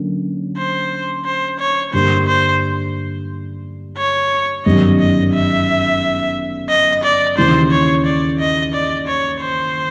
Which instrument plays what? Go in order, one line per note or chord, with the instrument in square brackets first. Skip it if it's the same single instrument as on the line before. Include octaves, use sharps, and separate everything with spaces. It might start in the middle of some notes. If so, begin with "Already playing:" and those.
Already playing: [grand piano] D3 F#3 A#3 C#4
[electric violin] C5
C5
C#5
[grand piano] G2 D3 G3 A#3 D4 [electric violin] C5
[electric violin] C5
C#5
[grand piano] G1 F#2 D#3 G3 [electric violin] D#5
[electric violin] D#5
E5
D#5
D5
[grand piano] D#2 C#3 E3 G3 [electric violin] C5
[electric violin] C#5
D5
D#5
D5
C#5
C5